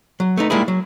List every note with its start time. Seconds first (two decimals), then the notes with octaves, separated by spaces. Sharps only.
0.20 F#3
0.37 A3 B3 D#4
0.50 G3 G#3 A#3 D#4 E4 G#4
0.68 F#3